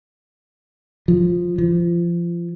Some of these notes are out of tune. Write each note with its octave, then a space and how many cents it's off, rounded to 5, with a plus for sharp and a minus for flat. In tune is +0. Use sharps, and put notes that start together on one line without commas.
F3 +5
F3 -25